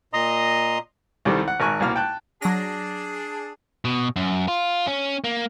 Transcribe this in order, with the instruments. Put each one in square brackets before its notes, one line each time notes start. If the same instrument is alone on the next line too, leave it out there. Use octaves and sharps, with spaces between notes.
[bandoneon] A#2 D#5 A#5 C6 D#6
[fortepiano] C2 D#3 G3 C4 A4
F#5
G#1 A#4 G#5 C#6 F#6
C2 B2 A#3 F6
G5 A5 F#6
[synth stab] F#3 A#6 [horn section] D4 G#4 A5
[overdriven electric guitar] B2
F#2
F4
C#4
A#3